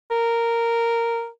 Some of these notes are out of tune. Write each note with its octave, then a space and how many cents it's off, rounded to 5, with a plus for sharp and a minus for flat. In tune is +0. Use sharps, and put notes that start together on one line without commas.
A#4 -5